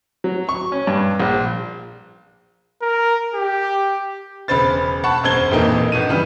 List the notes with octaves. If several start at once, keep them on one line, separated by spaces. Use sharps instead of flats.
F#3
C#6
C#4
G2
A#1
A#4
G4
E1 C#3 B4 C5 A6
F#5 A5 B5 C#6
E1 F#2 C5 G#6 G7
D#1 F2 E3 A#3 D#4
G1 B2 D#7
C#3 E3 G3